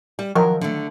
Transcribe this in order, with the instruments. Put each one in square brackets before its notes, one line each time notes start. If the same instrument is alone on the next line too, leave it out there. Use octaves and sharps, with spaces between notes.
[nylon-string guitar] G3
[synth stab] D#3 F3 F#3 [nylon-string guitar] A#4
[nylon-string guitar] D3 A3